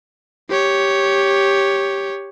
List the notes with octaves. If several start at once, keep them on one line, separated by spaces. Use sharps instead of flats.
G4 C#5